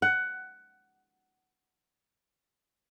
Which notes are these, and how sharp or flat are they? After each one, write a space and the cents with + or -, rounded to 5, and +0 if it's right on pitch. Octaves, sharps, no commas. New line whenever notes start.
F#5 +15